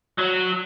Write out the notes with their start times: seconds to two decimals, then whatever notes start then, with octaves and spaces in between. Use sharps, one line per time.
0.18 F#3